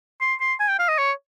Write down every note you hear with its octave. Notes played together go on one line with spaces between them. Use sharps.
C6
C6
G#5
G5
F5
D#5
C#5